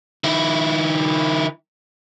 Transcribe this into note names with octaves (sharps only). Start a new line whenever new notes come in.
D#3 E4